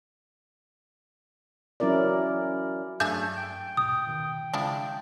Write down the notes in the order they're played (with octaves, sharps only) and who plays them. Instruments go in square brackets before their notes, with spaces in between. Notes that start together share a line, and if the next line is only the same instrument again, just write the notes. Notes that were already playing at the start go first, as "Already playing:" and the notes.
[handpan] F#3 C#4 E4 A#4 D5
[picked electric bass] G2 F#3 [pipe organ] A3 [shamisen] D4 G#4 E5 [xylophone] G6
[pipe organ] G5
[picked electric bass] D#1 G#2 B2 [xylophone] D#6
[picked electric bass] B2 D#3
[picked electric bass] C#3 G#3 [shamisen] F3 D4 E4